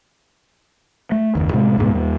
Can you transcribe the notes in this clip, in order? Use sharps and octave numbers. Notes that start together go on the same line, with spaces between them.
A3
F#1 D#2
A2 C3 G#3
D2 G#2 B2
D#2 G3